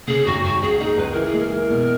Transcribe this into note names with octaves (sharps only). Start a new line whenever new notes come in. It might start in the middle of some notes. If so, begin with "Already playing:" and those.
C#3 G#4
G#1 F#4
G#1 F#4
C#2 G#4
D#4 G#4
C#2 B4
E3 A#4
G#4
G#3
A#4
E3
B2